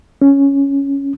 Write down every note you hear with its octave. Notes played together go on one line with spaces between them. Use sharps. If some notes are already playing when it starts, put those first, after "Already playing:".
C#4